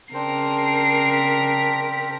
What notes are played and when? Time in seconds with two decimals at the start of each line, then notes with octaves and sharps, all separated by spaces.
0.14 C#3 C4 D4 A#4 C5 C7
1.12 B6